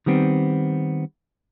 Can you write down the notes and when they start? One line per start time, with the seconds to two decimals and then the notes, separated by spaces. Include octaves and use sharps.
0.06 D#3 G3 B3 C4